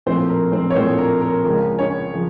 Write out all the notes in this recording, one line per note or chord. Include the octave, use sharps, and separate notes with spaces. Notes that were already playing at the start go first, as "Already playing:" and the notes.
A#1 A2 F3 C4 C5
A#4
C4 C5
C#5
A#1 A2 F3 C4 C5
A#4
A#4
C#2 C#3 F3 A#4
C#4 C#5
C#3 F3